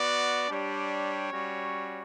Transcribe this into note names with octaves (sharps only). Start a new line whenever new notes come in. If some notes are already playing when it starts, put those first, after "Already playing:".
Already playing: B3 F#4 D5
G3 D4 G4 C#5
G3 C#4 F#4